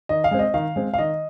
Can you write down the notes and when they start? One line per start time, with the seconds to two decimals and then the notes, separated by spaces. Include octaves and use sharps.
0.09 D#3 D#5
0.24 F5
0.31 G#3 C4
0.39 D#5
0.54 D#3 F5
0.76 G#3 C4
0.93 F5
0.98 D#3 D#5